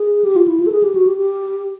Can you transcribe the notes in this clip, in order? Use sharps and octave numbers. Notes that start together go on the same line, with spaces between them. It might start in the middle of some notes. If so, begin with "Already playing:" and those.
Already playing: G#4
G4
F4
E4
F4
A4
G#4
G4
F#4
G4
G4